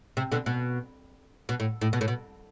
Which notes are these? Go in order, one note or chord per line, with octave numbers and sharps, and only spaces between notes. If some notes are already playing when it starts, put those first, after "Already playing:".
C3
B2 D3
B2
B2
A2
A2
B2
A2
B2